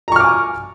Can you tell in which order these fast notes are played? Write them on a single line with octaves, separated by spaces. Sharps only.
A#5 C#6 F6 D6 G#5